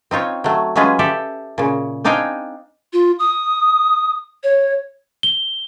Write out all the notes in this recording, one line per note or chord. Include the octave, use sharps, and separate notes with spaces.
C4 D#4 F4 C#5
F#3 A3
F#3 G#3 C#4 F4 G#4 B4
G4 A4 D5 E5
A#2 C#3
C4 D4 D#4 F5 G5 G#5
F4
D#6
C#5
G7